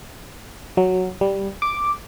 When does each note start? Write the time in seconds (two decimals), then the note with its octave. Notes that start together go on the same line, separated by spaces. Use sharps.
0.77 F#3
1.21 G3
1.62 D6